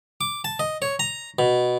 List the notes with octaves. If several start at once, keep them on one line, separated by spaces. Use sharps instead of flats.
D6
A5
D#5
C#5
A#5
B2